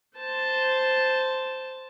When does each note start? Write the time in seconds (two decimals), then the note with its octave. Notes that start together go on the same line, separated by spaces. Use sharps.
0.18 C5 A5